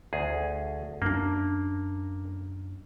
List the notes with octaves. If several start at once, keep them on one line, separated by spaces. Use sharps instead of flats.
D2 G#4
F#2 A#3 D4